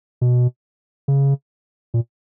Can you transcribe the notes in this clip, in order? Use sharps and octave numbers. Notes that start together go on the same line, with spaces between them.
B2
C#3
A#2